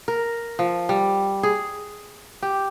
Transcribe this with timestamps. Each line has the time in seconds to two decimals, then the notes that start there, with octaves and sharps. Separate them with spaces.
0.08 A#4
0.59 F3
0.89 G3
1.43 G#4
2.42 G4